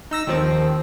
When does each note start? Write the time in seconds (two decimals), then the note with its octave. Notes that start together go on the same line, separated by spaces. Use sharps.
0.11 D#4 E6 A#6
0.27 D#2 D#3 F3 C4 C5